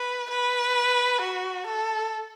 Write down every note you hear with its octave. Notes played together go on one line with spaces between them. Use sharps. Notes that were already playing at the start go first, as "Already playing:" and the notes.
Already playing: B4
B4
F#4
A4